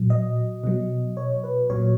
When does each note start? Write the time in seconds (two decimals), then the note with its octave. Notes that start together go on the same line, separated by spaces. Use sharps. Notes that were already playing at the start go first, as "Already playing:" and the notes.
Already playing: A#2 F#3
0.10 D#5
0.64 B2 F#3
1.17 C#5
1.44 B4
1.70 A#2 F#3 C#5